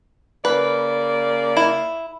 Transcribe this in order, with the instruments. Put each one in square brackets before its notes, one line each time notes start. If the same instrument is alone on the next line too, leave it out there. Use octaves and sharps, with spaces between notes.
[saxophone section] C#3 A#3 D5 [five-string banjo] B4
[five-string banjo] E4